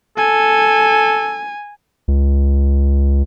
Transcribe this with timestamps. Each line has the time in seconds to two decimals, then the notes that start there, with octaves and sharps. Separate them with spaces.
0.17 A4 G#5
2.08 C#2